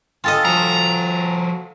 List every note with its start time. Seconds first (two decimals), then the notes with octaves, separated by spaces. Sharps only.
0.24 F4 A4 D#5 G5 G#5 A6
0.45 F3 F#4 A#5